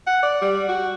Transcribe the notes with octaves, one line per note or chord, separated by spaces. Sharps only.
F#5
D5
G3
F#4